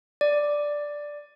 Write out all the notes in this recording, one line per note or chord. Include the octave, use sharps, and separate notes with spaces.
D5